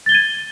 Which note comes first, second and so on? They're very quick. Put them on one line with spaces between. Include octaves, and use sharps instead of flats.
A6 G7 G#6 D#7